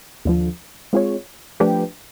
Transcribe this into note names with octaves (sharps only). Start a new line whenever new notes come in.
D#2 D3 F3
G#3 C4 F4 G#4 C#5
F3 A3 D4 G4 B4